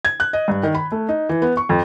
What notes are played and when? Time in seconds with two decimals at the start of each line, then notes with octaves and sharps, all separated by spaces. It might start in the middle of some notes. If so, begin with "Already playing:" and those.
0.05 G#6
0.20 F#6
0.33 D#5
0.48 G2
0.63 D#3
0.75 B5
0.92 A3
1.09 D#4
1.29 E3
1.42 B3
1.57 C#6
1.69 F2